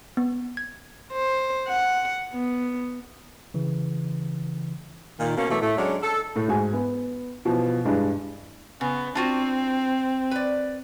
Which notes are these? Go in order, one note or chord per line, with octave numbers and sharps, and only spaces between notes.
B3
G#6
C5
F#5
B3
C#3 E3
A#2 D#3
B2 A#3 C#4
B2 E3 F#3 A3 A#3
A2 A3
F#3 G#3 C#4 D4
A4
A2 A3
G#2 F#4 G#5
B3
B2 E3 F3
G2 E3 G#3 D4
C#3 B3
C4 D4 F4 F#4
B4 D5